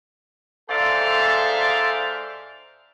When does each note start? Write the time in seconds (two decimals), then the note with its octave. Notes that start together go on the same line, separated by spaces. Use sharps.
0.69 G#2 A4 C5 D5 E5 F5